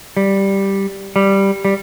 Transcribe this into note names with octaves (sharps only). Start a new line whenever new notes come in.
G3
G3
G3